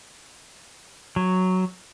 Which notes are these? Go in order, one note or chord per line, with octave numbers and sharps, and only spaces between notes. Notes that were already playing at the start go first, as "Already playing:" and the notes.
F#3